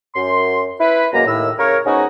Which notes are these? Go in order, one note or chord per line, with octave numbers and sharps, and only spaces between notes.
F#2 C6
E4 B4
F#2 B2 G#3 A#3 A#5
D#2 A2 E6
C#3 A#4 C#5
G#2 B3 C#4 D#4 F#4 D#5